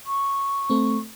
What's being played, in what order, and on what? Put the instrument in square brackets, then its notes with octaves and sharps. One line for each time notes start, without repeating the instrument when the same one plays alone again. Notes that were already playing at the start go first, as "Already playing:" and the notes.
[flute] C#6
[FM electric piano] A3 C4